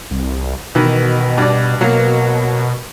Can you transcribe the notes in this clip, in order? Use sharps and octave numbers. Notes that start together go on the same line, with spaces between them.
C2
B2 D#3 E3
G2 D5
B2 F#3 A#3